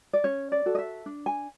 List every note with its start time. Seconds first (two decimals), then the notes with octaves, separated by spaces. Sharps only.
0.13 D5
0.24 C#4 C#5
0.52 D5
0.66 F#4 A4
0.75 D#5
0.79 E5
1.06 D4
1.26 G#5